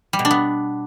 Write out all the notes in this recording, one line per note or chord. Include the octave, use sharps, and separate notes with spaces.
G3
B2
D4
B3